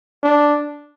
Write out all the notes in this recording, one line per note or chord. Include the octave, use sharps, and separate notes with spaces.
D4